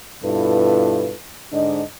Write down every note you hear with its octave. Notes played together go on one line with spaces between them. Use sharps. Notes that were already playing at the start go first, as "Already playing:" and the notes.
G2 B2 E4 F4 A4 B4
G#2 D3 D4 D#5